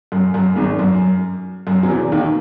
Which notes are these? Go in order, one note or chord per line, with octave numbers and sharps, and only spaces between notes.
F#2
F#2
G#1 G#2
F#2
F#2
F#3
E2 E3
D#2 D#3